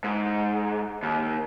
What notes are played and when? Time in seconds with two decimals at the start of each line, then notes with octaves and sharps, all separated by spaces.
0.04 G#2
1.03 D#2